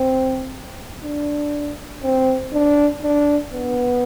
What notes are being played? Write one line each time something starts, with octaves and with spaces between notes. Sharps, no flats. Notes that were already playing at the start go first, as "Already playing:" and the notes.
Already playing: C4
D4
C4
D4
D4
B3